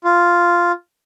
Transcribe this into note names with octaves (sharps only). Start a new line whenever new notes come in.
F4